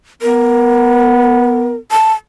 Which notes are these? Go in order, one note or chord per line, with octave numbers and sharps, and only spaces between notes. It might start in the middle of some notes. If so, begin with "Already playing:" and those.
B3 A#4
A5